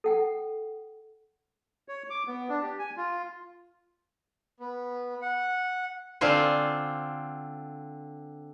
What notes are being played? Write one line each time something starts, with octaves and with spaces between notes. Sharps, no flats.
A4 F#5 G5
C#5
D6
B3
D4
G4
G#5
F4
B3
F#5
D3 C4 D4 F4 C5 G#5